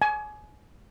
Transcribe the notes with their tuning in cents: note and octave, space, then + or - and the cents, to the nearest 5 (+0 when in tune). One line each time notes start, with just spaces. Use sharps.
G#5 +30